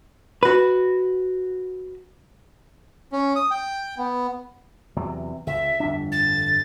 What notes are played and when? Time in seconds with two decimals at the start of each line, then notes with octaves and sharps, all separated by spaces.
0.43 F#4 B4
3.12 C#4
3.36 D#6
3.51 G5
3.98 B3
4.97 E2 C3 F#3
5.47 C#2 E5
5.80 G1 F2 D4
6.12 A6